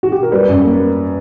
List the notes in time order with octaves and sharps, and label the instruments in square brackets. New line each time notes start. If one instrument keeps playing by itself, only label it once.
[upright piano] F#4
G4
A#4
[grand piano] G3 [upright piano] B4
[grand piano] F#2
A#3